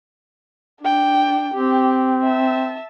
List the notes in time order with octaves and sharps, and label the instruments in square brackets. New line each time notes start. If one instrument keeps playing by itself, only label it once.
[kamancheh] D4 G5
[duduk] C4 [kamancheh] G4
[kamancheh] E5 A5